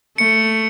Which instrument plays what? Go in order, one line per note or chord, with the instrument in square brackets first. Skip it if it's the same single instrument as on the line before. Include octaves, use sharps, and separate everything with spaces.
[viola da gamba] A3 [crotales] C#7